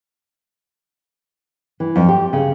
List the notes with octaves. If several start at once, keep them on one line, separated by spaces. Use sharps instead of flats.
E3
F2
G4
C#3